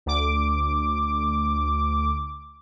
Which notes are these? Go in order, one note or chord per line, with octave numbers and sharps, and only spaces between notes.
D2 D6